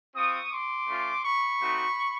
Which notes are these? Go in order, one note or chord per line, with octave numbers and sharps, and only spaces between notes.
C4 F4 C#6 D#6
C6 D6
A3 C#4 F4
B5 C#6
A3 C4 D#4 F#4